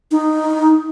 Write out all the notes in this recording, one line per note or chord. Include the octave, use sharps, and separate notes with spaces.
D#4